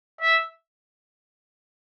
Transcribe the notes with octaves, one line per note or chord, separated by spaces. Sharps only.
E5